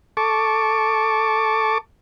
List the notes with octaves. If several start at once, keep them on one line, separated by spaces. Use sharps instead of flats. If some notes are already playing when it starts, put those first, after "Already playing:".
A4 A5 C#6 D6